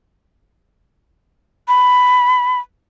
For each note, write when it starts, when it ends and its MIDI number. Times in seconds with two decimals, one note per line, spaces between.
1.68 2.60 83